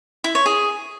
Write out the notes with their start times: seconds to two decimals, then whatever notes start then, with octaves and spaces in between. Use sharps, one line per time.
0.24 E4
0.35 C#5
0.46 G#4